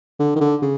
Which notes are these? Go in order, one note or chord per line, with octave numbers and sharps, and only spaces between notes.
D3
D#3
D3
C#3